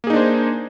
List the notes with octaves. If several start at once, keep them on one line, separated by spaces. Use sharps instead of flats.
A#3 D4 D#4 G#4 C5